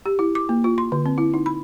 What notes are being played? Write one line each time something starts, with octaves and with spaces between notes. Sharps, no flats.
G4
E4
D6
A#3
F4
C6
D3
C4
E4
D#4
B5